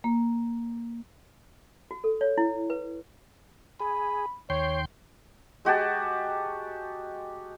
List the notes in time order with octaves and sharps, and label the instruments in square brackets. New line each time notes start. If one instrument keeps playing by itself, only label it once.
[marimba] A#3
[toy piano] F#4
A4
C#5
E4
B4
[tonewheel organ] G#4 [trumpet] B5
[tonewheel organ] D#2 G5 C6 [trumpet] C#5
[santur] G#3 F#4 G4 A5